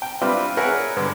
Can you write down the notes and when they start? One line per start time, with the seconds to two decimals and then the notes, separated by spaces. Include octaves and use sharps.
0.02 G5
0.21 G3 C4 D4 E4 F4 B4
0.57 G#4 A#4 B4 C#5 E5 F#5
0.96 C#2 G2 D3